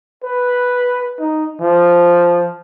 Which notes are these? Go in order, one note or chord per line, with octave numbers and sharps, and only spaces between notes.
B4
D#4
F3